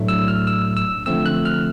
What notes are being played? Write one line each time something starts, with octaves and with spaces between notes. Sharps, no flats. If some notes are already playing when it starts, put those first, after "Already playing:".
Already playing: A2 F#3 A3 D4
E6
F6
E6
E6
D3 F3 A3 C4 E6
F#6
F6